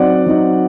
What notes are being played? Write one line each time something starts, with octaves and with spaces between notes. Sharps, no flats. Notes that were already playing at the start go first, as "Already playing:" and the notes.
Already playing: F#3 C4 D#4 D5 F#5
F#3 C4 D#4